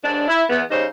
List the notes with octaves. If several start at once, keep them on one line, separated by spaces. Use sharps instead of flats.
D#2 G#2 D4
E4
E2 B3
C#3 G3 D#4 C5